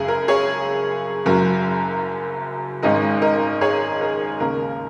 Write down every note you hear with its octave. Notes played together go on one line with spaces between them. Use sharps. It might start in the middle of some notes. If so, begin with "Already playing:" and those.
Already playing: F#1 F#2 C#3 G#4
A#4
G#4 C#5
F#1 F#2 F#3 A#4
G#1 G#2 G#3 C#4 A#4 D#5
A#4 D#5
G#4 C#5
A#4
D#2 C#3 A#3 A#4